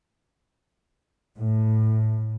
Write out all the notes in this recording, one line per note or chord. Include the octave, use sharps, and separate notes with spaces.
A2